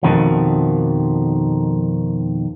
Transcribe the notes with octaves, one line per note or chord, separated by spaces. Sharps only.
F2 B2 D#3 F3